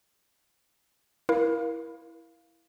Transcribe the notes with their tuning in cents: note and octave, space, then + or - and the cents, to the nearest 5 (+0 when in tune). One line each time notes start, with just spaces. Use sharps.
E4 +0 A#4 +25 F5 -5